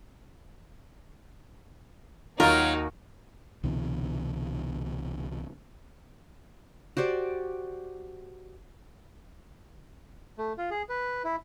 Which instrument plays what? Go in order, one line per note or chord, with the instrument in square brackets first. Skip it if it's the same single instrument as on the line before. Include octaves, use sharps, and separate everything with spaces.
[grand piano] D#2 D#3 [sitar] F#3 F4 [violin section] A#3 D#4 F#4 [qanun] A#4
[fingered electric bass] C2 B2 D3 E3
[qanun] F#4 G4 C5 D5
[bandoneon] A3
F4
G#4
B4
E4